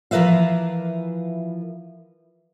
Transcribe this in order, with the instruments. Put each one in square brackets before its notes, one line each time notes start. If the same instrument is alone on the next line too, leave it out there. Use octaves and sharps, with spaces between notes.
[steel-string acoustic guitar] E3 F3 A#4 B4 E5 F5